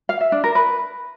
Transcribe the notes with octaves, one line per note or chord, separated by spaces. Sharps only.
F5
E5
D4
A#4
B4